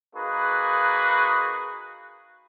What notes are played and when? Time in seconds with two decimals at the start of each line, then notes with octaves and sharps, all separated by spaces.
0.15 A#3 D#4 F#4 G#4 B4